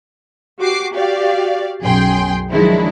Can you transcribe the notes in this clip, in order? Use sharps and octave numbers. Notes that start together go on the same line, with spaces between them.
F#4 G4 D6 C7
F#4 G4 D5 F5
B1 F#2 G#4 G5 C6
D#3 F3 F#3 G#3 D4 E4